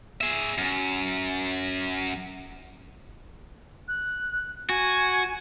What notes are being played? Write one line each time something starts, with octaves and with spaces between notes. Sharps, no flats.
G#4 E5
F#2
F#6
F#4 G#5